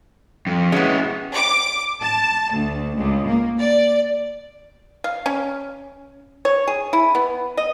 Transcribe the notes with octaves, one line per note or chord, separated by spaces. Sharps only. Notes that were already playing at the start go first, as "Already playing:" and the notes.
F2
G#3 A#3 B3 C#4 E4
D6
A5
D2
C#2
A#3
D5
F5
C#4
C#5
G#4
E4
B3
D#5